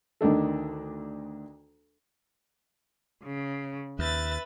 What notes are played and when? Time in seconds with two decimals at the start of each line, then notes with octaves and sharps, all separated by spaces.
0.21 D2 D#3 D4 A4
3.23 C#3
3.99 D#2 B4 E5 A6